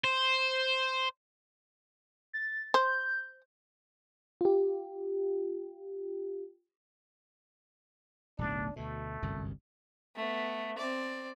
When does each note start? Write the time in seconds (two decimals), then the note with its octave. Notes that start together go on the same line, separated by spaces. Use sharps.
0.04 C5
2.33 A6
2.74 C5 G6
4.41 F4 G4
8.39 D1 B1 A3 D4
8.76 D2 B2 A3
9.22 G1 C2 F#2
10.15 A3 B3
10.78 C4 D5